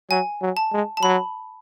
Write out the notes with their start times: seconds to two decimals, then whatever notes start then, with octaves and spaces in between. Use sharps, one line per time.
0.10 F#3 G#5
0.41 F#3
0.57 A5
0.73 G#3
0.97 A5
1.02 F#3 B5